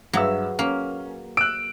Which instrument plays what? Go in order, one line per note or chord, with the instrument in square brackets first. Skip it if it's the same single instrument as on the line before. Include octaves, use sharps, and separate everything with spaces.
[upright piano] G2 E5 E6 [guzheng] F#3 [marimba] G#4 B4
[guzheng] A#3 [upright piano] C#4
[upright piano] E6 F#6 [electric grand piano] D7